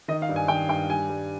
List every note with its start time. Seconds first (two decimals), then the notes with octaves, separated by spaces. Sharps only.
0.08 D#3 D#5
0.22 F5
0.29 G2
0.36 G#5
0.48 D#3 G5
0.69 G2 G5
0.90 G3 G#5
1.09 G3